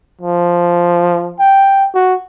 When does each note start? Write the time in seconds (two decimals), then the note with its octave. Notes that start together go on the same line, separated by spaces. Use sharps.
0.21 F3
1.40 G5
1.95 F#4